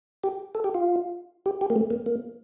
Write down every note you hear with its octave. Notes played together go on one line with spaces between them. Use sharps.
G4
A4
G4
F4
G4
G4
A#3
A3
A#3
A#3